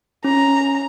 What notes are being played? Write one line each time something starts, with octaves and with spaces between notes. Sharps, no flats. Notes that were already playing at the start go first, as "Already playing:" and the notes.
C#4 A#5